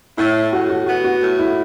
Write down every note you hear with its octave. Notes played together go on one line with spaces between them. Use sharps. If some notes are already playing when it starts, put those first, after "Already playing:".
A2 E4
A2 F#4
F#4
B3 F#4
F#4
A2
E4